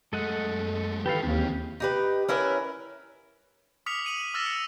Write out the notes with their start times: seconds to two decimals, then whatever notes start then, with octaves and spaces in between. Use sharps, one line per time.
0.13 F#2 G#3 A3 A4 D#5 F#5
1.06 D#3 E3 G4 A4 B4 F5
1.23 D#2 G#3 C4 C#4 G4
1.80 D#4 G4 B4
2.29 C#4 E4 A#4 B4
3.86 D6 D#6 F6 B6 C#7 F7
4.04 C#7 D#7 F#7
4.34 D6 E6 F6 A6 A#6 E7
4.46 C#7